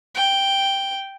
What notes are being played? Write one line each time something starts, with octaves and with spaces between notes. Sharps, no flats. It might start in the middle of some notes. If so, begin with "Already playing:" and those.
G5